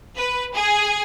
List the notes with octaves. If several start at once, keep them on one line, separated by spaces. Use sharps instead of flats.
B4
G#4